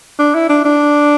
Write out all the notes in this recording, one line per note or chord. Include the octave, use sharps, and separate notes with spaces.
D4
E4
D4
D4